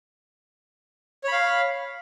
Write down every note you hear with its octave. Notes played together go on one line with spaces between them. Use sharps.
C#5 F5 B5